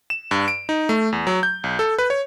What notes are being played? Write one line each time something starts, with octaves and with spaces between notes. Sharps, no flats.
E7
G2
D7
D#4
A3
E2
F#3
G6
B1
A4
B4
C#5